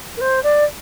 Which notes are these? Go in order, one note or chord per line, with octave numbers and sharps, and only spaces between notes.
A#4
C5
D5